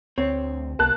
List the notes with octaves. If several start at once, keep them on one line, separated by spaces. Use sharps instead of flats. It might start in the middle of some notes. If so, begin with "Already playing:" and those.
D2 C4 C#5
C2 A#3 A5 F#6